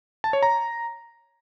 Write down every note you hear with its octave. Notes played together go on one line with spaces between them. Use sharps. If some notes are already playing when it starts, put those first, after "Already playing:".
A5
C#5
A#5